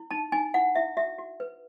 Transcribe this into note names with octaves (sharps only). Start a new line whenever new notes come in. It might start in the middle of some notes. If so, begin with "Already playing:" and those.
Already playing: E4
D#4 A5
D#4 G#5
E4 F#5
E4 E5
F#4 E5
F#4
B4